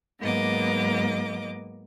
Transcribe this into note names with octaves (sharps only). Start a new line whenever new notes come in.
G#2 F#3 A#3 B3 D#5 D6